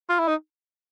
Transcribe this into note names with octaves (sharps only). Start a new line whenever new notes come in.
F4
E4
D#4